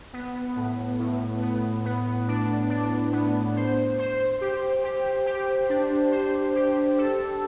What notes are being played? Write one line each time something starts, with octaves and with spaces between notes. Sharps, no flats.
B3
A2
A2
B3
B3
D4
D4
B3
C5
C5
G4
G4
G4
D4
C5
G4
A4